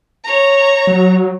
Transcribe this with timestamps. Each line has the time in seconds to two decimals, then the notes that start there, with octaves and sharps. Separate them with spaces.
0.24 C#5 A#5
0.87 F#3